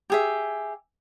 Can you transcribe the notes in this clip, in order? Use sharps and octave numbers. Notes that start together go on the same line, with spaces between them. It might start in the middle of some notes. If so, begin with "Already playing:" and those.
G4 G#4 E5